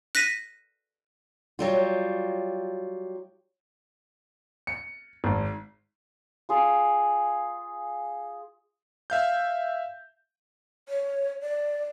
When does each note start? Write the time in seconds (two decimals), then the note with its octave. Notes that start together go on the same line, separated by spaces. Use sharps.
0.15 F#6 A#6 B6 D#7
1.59 F#3 G3 F4
4.67 C#7
5.24 G#1
6.49 F4 G#4
9.10 E5 F5 G6
10.89 C#5
11.41 D5